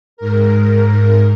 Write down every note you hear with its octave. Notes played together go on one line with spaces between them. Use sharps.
G#2 A#4